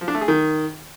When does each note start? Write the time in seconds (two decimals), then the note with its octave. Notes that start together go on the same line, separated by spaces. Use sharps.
0.01 F3
0.08 D4
0.15 A3
0.21 G#4
0.28 D#3